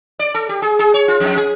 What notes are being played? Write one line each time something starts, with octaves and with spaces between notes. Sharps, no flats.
D5
A4
G4
G#4
G#4
C#5
F4
F2
G#4